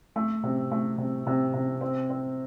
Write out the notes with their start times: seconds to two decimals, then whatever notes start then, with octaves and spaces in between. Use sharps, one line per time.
0.16 A3
0.43 C3
0.71 A3
0.98 C3
1.27 C3
1.54 C3
1.81 C4
2.10 C4